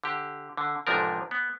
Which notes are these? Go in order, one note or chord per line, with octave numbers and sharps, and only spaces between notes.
D3 G4
D3
A1 G#2 C3 F3 D4 A#4
B3